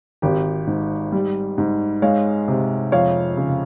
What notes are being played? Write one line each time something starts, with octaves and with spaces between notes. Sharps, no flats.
G#1 G4
G#2
G3
G#2
G#3 C#5 F5
C3
F2 C#5 F5
C#3